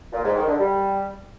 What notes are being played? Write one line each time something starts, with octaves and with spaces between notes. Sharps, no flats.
A#2
G#2
D#3
D3
G3